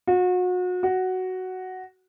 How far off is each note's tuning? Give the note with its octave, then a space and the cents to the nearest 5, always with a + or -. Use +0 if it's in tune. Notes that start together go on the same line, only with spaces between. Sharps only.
F#4 -35
F#4 +5